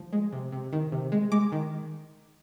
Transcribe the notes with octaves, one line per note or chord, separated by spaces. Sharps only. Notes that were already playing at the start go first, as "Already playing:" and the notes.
Already playing: F3
G#3
C3
C3
D#3
C3
G#3
G#3 D6
D#3